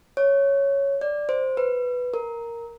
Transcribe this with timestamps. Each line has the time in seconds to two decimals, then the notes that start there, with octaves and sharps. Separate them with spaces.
0.17 C#5
1.01 D5
1.29 C5
1.57 B4
2.14 A#4